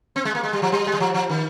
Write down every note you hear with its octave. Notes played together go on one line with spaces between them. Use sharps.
C4
G#3
A#3
G#3
G3
F3
G3
G#3
G3
F3
F3
D#3